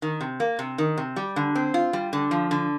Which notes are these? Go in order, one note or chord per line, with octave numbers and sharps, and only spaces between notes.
D#3
C3
A#3
C3
D#3
C3
G3
D3
C4
F4
G3
D3
F3
D3